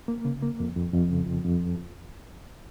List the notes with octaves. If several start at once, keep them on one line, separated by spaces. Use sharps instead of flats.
A#3
C#3
A#3
F2
F2
F2
C#3
F2
F2